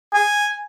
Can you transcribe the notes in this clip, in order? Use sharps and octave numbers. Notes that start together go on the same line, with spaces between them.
G#5